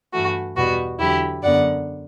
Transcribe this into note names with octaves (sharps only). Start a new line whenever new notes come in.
G2 E3 A3 F#4
E2 B2 G3 B3 F#4
E2 D3 F#3 E4 G4
F#2 D3 F#3 B3 D5 F#5